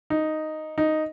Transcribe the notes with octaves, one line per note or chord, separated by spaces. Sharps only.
D#4
D#4